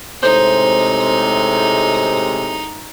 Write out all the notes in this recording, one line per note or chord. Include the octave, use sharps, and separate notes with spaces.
A2 C3 G#3 D#4 C5